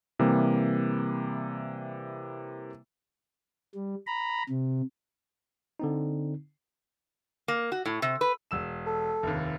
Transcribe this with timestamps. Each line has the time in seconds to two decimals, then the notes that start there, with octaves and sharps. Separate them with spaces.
0.19 C3 E3 G3 A#3
3.75 G3
4.07 A#5 B5
4.49 C3
5.80 D3 C4 D#4
7.48 A#3
7.72 F#4
7.86 A2
8.02 C3
8.21 B4
8.51 E1 E6 E7
8.87 A4
9.23 F1 D#2